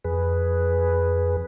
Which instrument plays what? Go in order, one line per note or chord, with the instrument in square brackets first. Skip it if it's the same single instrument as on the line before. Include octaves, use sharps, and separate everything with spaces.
[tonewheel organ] F2 G#4 B4